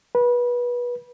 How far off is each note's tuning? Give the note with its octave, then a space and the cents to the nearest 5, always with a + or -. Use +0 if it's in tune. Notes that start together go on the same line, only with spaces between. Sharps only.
B4 -25